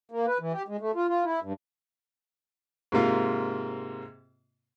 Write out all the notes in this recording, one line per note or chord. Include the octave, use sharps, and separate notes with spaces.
A#3
B4
E3
G4
G#3
A3
F4
F4
E4
G2
G#2 C3 A#3 F4